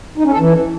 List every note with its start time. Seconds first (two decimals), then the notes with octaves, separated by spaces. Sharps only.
0.18 D#4
0.25 C#4
0.32 A4
0.39 E3